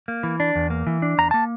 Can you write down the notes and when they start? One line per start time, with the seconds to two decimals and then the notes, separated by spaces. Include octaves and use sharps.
0.08 A#3
0.23 E3
0.40 D4
0.56 E2
0.70 A#3
0.87 E3
1.02 D4
1.18 E2 A#5
1.31 A#3 A5